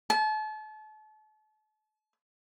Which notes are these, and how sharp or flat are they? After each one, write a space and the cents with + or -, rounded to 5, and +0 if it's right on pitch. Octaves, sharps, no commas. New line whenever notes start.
A5 -35